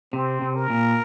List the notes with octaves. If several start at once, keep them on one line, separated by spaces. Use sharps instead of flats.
C3 C4
C3
A#4
A#2